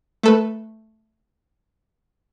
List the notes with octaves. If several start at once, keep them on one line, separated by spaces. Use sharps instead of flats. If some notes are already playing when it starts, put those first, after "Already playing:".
A3 A4 B4